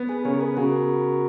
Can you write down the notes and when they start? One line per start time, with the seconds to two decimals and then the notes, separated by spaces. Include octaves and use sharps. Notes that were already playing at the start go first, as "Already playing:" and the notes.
Already playing: B3
0.09 G#4 B4
0.25 C#3 A#4 C#5
0.41 G#4 B4
0.57 C#3 F#4 A#4